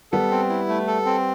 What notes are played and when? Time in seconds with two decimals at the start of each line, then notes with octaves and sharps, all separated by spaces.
0.12 G3 B3 A4
0.31 C4
0.49 E4
0.68 A3
0.87 A4
1.05 C4